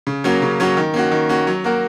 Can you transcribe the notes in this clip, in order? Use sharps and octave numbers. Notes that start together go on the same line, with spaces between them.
C#3
F#3 A#3 C#4 F#4
C#3
F#3 A#3 C#4 F#4
D#3
A#3 C#4 F#4
D#3
A#3 C#4 F#4
F#3
A#3 F#4 A#4